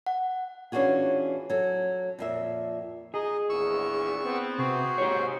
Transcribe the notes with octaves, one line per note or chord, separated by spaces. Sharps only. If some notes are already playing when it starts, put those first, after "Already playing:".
F#5
E3 C#4 D4 F4 F#4 G#4
F#3 A4
F2 A#2 E5
D#4 G#4 D#5
A#1 E2 C#6 E6
B3 C4
C3 F#4 G#4 C5
G#2 G4 C#5